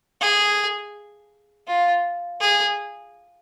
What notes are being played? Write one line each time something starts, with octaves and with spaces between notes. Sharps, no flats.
G#4
F4
G#4